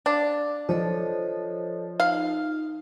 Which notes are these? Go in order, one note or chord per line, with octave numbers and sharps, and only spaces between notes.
D4 F5 D6
F3 A4 C#5 D#5
D#4 F5